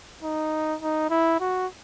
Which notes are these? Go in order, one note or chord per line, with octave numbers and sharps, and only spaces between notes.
D#4
D#4
E4
F#4